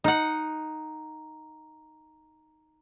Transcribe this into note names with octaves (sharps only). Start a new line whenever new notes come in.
D#4 F#5